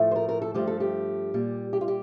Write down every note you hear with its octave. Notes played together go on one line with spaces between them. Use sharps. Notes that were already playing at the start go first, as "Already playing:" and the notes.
Already playing: A2 F3 A3
C5
A#4
A#4
A4
G2 F3 A3 G4
A4
G4
A#2 G3
G4
F4
G4